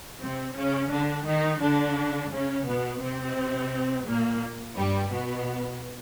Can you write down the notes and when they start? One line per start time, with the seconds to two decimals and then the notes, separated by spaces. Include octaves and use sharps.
0.21 C3 C4
0.55 C#3 C#4
0.91 D3 D4
1.26 D#3 D#4
1.61 D3 D4
2.31 C#3 C#4
2.67 B2 B3
3.02 C3 C4
4.06 A#2 A#3
4.77 G2 G3
5.12 B2 B3